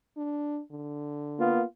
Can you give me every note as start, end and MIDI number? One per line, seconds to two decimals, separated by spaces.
0.17 0.60 62
0.71 1.56 50
1.39 1.62 58
1.39 1.62 59
1.39 1.62 65